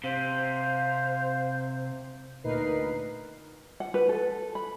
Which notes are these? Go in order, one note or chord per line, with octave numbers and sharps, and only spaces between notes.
C3 C5 F5
D2 A#2 D#4 A#4 B4 C7
F#5
B4
A4
B5